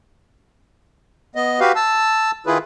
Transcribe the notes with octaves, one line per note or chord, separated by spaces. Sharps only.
B3 D#5
F#4 G4 B4 F5
A5 E6
D#3 E4 F4 G#4 B4